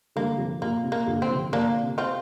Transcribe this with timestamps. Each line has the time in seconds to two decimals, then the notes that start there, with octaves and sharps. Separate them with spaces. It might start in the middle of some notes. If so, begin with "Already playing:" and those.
0.16 D3 G3 A#3
0.38 C3 F3
0.62 A#2 A#3
0.84 C3
0.92 A#3
1.07 A#2 D3
1.22 C4
1.30 C3 F3
1.52 A#2 D3 A#3 D4
1.83 C3
1.98 C4 F4